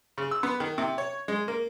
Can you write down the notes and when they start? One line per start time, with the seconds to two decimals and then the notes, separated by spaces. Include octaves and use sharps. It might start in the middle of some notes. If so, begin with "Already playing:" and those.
0.18 C#3
0.31 E6
0.43 B3
0.60 D#3
0.78 C3
0.98 C#5
1.28 G#3
1.48 A#3